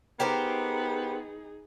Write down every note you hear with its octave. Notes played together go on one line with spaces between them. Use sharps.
B3 D#4 G4 G#4 A#4 C5